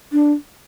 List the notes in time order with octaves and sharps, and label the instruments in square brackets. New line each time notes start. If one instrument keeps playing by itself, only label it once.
[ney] D4